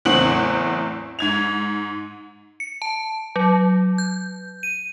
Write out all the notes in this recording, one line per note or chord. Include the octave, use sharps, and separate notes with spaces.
F#1 E2 A2 C4 F#5 F#7
G#2 G#6 F7
C#7
A5
F#3
G6
D#7